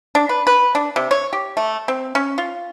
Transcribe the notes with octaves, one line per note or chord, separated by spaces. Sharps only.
D4
B4
B4
D4
C3
C#5
G4
A3
C4
C#4
F4